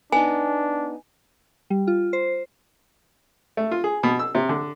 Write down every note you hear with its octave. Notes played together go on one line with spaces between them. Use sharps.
B3 D4 D#4 G#5
G3
F4
C5
A3
F4
G#4
B2
E6
C3
D3